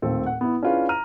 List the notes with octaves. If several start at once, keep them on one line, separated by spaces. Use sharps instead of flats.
D#1 A3 C4 F4 A4
F#5
B3 E4
C#4 D4 E4 F4 G#4 B4
A#5 F6 D#7